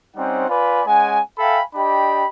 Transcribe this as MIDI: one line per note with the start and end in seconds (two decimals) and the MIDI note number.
0.16 0.45 55
0.16 0.45 60
0.16 0.45 61
0.16 0.45 63
0.16 0.45 72
0.16 0.45 78
0.48 0.81 65
0.48 0.81 71
0.48 0.81 74
0.48 0.81 80
0.48 0.81 83
0.87 1.19 56
0.87 1.19 61
0.87 1.19 78
0.87 1.19 80
1.38 1.60 69
1.38 1.60 76
1.38 1.60 77
1.38 1.60 79
1.38 1.60 80
1.38 1.60 83
1.75 2.25 62
1.75 2.25 67
1.75 2.25 75
1.75 2.25 79
1.75 2.25 83